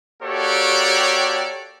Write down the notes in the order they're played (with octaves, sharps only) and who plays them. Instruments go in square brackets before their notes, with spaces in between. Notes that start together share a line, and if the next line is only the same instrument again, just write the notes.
[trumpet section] A#3 F#4 G4 A4 C#5 D5